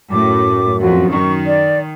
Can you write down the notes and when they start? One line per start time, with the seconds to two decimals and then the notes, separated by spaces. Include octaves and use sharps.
0.12 F#2 A2 D6
0.81 F2 F#4
1.11 D#3 C#6
1.47 D5